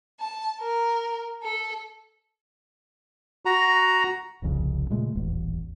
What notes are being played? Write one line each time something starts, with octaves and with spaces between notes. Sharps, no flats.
A5
A#4
A4
F#4 A#5
D#1 C2 F2 C#3
A#2 C#3 G#3 A3
D#1 A1 E2